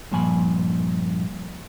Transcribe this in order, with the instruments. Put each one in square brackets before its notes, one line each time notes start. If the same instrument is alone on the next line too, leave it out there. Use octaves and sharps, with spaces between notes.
[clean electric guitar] G2 A#2 F3 G#5 A#5 B5